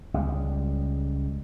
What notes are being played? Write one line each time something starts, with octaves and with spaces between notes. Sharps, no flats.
C#2 G3 G#3